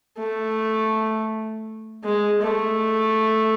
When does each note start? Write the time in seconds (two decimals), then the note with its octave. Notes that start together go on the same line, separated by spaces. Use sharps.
0.17 A3
2.04 G#3
2.41 A3